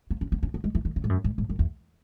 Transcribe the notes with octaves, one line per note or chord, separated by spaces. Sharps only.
B3
C#4
B3
C#4
B3
G#3
E3
D#3
C#3
G#2
F#2
G#2
G#2
F#2
E2